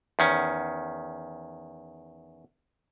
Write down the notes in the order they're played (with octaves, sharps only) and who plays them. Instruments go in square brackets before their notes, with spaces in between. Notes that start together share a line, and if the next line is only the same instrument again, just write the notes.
[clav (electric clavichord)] E2 D#3 C#4